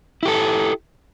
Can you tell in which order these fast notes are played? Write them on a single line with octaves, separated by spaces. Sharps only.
E4 G4 A4